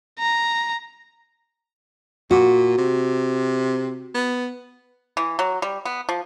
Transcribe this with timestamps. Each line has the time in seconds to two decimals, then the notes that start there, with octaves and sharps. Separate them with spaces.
0.19 A#5
2.31 A#2 F#4
2.78 C3
4.15 B3
5.17 E3
5.39 F#3
5.62 G3
5.85 B3
6.09 F3